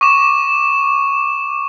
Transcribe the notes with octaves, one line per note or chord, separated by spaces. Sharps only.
C#6 D6 E7